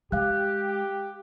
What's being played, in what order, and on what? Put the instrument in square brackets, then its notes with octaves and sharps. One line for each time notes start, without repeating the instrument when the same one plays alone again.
[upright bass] G#3 [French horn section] G4 [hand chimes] F5 F#6